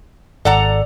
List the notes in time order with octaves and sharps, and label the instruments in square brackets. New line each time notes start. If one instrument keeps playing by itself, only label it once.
[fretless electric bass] G#1 [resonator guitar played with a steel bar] A4 F#5 A#5 [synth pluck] D5